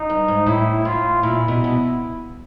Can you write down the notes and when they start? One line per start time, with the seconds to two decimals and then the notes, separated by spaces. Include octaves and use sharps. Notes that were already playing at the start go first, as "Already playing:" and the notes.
Already playing: D#4
0.10 G2
0.28 G#2
0.47 A2 E4
0.85 A2 F4
1.23 A#2 E4
1.48 B2
1.64 B2